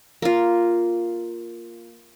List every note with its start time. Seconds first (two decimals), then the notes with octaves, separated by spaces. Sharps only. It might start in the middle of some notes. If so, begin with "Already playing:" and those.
0.22 A#3 F4